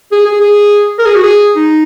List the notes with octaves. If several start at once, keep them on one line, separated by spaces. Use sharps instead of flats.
G#4
G#4
G#4
A#4
G#4
F#4
G#4
D#4